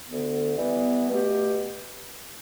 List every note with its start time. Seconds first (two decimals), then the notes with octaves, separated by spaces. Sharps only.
0.06 D2 D3 B3
0.58 E3 G3 B3
1.09 B2 A3 G4